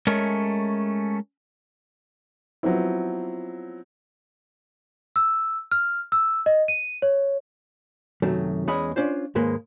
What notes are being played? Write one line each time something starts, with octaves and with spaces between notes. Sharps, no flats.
G#3 A3 C#4 A#4 C#5
F3 F#3 B3 C4 E4
E6
F6
E6
D#5
D#7
C#5
F#2 C3 D#3 F#3 A3
E2 G#3 C#4 G#4 D#5 B5
C#4 D4 F4 C5
D#2 G#2 G#3 A#3 B4